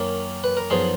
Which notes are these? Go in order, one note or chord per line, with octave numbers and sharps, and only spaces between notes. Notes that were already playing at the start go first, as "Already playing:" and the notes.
Already playing: F#2 D#3 A#3 C#4
B4
A#4
F#2 F3 B3 D#4 G#4